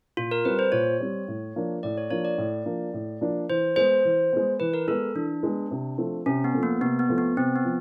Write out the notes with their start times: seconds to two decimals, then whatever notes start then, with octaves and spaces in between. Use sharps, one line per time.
0.17 A#2 F4
0.31 A#4
0.45 G3 C4 B4
0.59 C5
0.72 A#2 C#5
1.00 G3 C4
1.28 A2
1.56 F3 A#3 D4
1.83 A2 D5
1.98 C#5
2.10 F3 A#3 D4 C#5
2.25 D5
2.38 A2
2.66 F3 A#3 D4
2.94 A2
3.21 F3 A#3 D4
3.49 E3 C5
3.76 G#3 B3 C5
4.05 E3
4.33 G#3 B3
4.60 E3 B4
4.74 A#4
4.88 G#3 B3 A4
5.15 E3 D4
5.43 G#3 B3
5.71 C3
5.98 F3 A3 C4
6.26 C3 C#4
6.44 B3
6.54 F3 A3 C4
6.63 A#3
6.81 C3 B3
6.99 B3
7.09 F3 A3 C4
7.18 B3
7.37 C3 C4
7.56 B3
7.65 F3